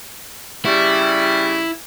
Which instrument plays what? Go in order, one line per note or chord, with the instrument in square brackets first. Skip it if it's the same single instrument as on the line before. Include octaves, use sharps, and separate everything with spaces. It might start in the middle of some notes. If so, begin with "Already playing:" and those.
[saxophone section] C#3 G3 [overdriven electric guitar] E4